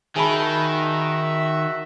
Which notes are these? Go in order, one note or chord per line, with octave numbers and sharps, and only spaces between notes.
D#3 F#4 G#4 E5 A5 B5